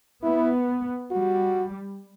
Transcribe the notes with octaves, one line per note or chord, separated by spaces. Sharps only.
B3 E4
G3 F#4